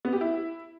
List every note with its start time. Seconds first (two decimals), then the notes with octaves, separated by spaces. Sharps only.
0.05 B3
0.13 G4
0.21 E4